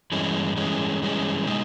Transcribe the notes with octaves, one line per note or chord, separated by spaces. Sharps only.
G2 E3 G#3 C#4
G2 E3 G#3 C#4
G2 E3 G#3 C#4
B2 G#3 D#4